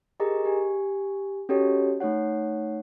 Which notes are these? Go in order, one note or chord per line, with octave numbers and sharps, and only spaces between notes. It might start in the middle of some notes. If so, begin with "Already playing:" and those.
G4 G#4 A#4 D#5 G#5 A#5
G4 G#5
C#4 F#4 G4 A4 C#5 D#5
A3 D#4 C#5 F#5